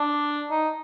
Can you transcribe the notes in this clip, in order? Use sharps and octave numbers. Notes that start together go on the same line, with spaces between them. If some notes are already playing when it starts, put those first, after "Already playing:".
Already playing: D4
D#4